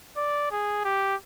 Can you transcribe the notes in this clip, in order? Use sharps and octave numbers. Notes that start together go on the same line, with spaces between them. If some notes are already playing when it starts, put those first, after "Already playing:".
D5
G#4
G4